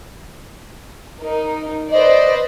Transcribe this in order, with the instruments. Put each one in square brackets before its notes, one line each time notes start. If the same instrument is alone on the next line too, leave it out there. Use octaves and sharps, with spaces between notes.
[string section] D#4 A#4
[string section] B4 C5 D5 [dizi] D#5